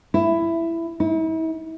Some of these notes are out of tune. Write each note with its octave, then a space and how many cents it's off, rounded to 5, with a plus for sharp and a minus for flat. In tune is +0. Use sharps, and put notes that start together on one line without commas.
E4 +10
E4 -40